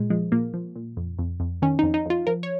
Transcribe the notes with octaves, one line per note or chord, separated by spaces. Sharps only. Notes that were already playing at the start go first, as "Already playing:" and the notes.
Already playing: A#2 G#3
F3 G#3
A#2 A#3
F3
A#2
F2
F2
F2
D#3 C#4
D#4
F2
D#4
F2 F4
F3 A#4
C#5